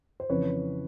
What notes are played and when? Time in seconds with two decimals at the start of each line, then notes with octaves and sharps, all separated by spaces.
0.20 C5
0.30 F2 C#3 E3 B4 C#5